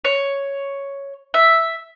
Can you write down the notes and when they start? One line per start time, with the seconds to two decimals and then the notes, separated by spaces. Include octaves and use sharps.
0.05 C#5
1.34 E5